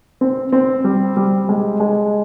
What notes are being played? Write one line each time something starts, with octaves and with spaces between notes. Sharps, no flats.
C4
C4
G3
G3
G#3
G#3